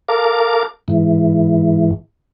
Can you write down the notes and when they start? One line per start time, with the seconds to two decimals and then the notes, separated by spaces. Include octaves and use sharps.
0.08 A4 A#4 F5 D6
0.88 G#2 E3